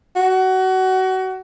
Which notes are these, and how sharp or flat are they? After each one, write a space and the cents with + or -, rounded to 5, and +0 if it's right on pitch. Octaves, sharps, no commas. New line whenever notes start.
F#4 +25